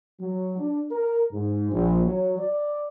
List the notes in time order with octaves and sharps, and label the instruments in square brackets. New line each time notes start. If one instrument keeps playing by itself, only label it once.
[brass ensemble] F#3
D4
A#4
G#2
A#1
F#3
D5